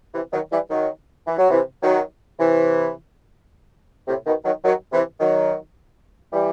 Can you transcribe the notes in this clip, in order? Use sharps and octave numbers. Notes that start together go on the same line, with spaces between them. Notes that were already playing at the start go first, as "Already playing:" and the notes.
C3 E3
D#3 F#3
E3 G3
D#3 F#3
E3
F#3
C3 E3
D#3 F#3
C3 E3
A2 C3
B2 D#3
D#3 F#3
D#3 F#3
C3 E3
D#3 F#3
E3 G3